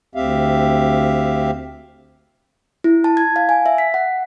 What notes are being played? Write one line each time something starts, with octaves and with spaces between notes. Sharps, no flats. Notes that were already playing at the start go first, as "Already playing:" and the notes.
D2 C4 G4 E5 F5
E4
A5
G#6
F5
G#5
E5
B6
F#5